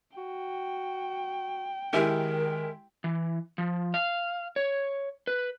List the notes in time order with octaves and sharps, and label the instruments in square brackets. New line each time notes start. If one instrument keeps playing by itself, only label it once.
[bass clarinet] F#4 [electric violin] G5
[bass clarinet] D#3 [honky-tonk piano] G#3 E4 G4 [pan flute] A#4
[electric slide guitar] E3
F3
F5
C#5
B4